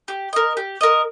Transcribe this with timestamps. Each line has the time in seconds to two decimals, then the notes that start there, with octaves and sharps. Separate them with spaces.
0.08 G4
0.33 A#4 D#5
0.57 G4
0.81 A#4 D#5